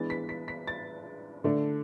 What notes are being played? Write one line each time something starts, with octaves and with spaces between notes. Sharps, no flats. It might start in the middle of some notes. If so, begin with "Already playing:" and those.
Already playing: E3 G#3 B3 D4 A6
B6
B6
B6
A6
D3 A3 D4